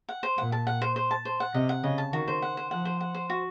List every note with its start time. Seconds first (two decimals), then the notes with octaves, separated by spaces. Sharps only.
0.09 F#5
0.23 C5
0.37 A#2 F#5
0.52 A5
0.67 F#5
0.82 C5
0.96 C5
1.11 A5
1.25 C5
1.40 F#5
1.54 C3 D#5
1.69 F#5
1.83 C#3 D#5
1.98 A5
2.13 D#3 F#4
2.28 C5
2.42 F#5
2.57 C5
2.71 F3 F#5
2.85 C5
3.01 F#5
3.14 C5
3.30 F#4